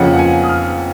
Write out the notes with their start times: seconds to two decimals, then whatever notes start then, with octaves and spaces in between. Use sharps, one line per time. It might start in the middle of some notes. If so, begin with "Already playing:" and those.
Already playing: F2 C#3 F3 A#3 C#4 F#5
0.14 F#5
0.18 G#5
0.43 D#6
0.49 F6